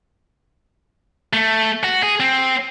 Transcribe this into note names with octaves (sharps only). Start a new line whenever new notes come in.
A3
F#4
G#4
C4